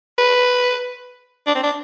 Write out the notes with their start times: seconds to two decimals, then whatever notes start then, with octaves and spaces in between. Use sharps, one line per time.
0.18 B4
1.47 D4
1.55 C4
1.63 D4